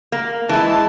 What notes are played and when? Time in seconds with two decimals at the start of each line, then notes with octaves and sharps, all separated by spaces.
0.12 A#3
0.49 E3 G#3 E4 A5